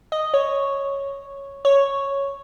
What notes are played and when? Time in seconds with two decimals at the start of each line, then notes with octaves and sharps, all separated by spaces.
0.12 D#5
0.34 C#5
1.65 C#5